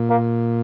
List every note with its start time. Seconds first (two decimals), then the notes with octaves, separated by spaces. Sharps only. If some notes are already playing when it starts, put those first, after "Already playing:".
Already playing: A#2
0.10 A#3